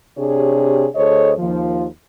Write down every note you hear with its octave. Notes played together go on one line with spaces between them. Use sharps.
C3 D4 G4 G#4 C#5
D2 G#4 A4 C5 C#5 D#5
D#2 F3